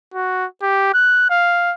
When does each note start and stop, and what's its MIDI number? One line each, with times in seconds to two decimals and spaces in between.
0.14 0.46 66
0.62 0.91 67
0.94 1.28 90
1.30 1.74 77